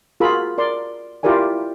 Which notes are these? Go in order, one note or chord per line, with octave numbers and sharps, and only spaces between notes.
F4 F#4 G#4 A#4 B5 E6
A#4 D5 C6
E4 F4 G4 A#4 D5 G#5